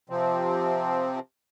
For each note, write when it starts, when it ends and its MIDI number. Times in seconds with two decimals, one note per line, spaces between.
0.10 1.20 48
0.10 1.20 53
0.10 1.20 60